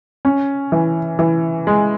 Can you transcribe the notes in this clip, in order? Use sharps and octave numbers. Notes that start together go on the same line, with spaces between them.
C#4
E3
E3
G#3